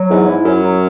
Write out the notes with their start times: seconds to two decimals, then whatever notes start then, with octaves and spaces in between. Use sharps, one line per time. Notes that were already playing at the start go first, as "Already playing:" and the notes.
Already playing: F#3
0.10 E2 G#2
0.28 E4
0.45 F#2 C#4
0.63 F#3